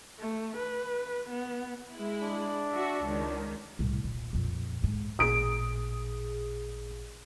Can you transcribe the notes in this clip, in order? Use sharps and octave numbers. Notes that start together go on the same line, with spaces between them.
A3
B4
B3
G#3 E4
D4
F#4 E5
C#2 D#3
C2 A2
D#1
A#1 F2
D1 G#2
A1 A#2 G#4 D#6 D7